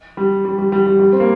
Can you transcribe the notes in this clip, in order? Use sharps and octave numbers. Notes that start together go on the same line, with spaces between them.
G3
G3
G3
G3
G3
G3
C4
A#3